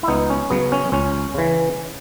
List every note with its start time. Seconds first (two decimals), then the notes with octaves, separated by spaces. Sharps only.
0.03 E4
0.08 C#2 B3 D#4
0.30 C#4
0.50 C#3 F#3 B3
0.72 C#4
0.92 C#2 C#4
1.34 C#3 E3